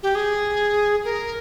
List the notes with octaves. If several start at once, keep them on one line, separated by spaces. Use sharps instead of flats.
G4
G#4
A#4